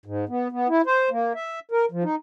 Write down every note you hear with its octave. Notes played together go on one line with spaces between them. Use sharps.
G#2
B3
B3
E4
C5
A#3
E5
A#4
F3
D#4